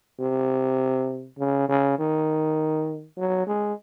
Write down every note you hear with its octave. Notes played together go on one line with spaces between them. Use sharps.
C3
C#3
C#3
D#3
F#3
G#3